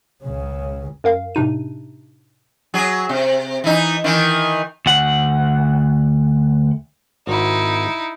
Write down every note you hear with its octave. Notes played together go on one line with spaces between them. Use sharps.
C#2 C#3
F#2 A#4 F5
A2 C3 D4 D#4 D#7
F#3 G#4
C3
E3 D#4
D#3 E3
D2 F#5
G#1 D#4 E4